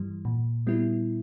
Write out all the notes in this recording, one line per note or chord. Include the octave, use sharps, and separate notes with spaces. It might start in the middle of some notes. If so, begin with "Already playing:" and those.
Already playing: G2 E3 G3
A#2
G3 B3 E4